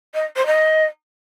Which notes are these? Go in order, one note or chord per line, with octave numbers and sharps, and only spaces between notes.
D#5
C5
D#5